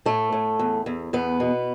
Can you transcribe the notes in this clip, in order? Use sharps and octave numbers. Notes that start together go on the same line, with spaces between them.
A2 A3
A2
E2
E2
E2 B3
B2